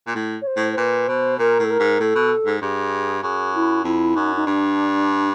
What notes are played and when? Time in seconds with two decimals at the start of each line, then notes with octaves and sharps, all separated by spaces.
0.07 A#2
0.15 A2
0.41 C#5
0.47 C5
0.56 A2
0.73 C5
0.77 A#2 B4
1.07 B2 C5
1.39 A#2 A#4
1.59 A2 A4
1.70 A#4
1.80 G#2
2.00 A2 A4
2.15 B2
2.46 G#2
2.62 G2 G#4
3.23 F#2 G#4
3.54 E4
3.84 F2 E4
4.16 F#2 D#4
4.36 D#4
4.46 G2 D4